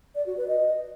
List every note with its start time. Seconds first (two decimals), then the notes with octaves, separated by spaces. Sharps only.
0.15 D5
0.26 F#4
0.37 B4
0.48 D#5